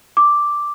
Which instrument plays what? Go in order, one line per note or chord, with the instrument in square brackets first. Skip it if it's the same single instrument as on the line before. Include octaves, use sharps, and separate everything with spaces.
[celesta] D6